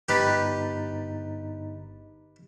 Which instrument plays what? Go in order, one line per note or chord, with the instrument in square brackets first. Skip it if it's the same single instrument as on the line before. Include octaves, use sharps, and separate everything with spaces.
[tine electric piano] G1 D#4 A6 [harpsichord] G4 B4